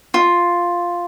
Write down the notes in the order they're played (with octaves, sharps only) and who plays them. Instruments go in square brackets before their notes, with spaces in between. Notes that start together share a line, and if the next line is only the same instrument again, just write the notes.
[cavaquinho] F4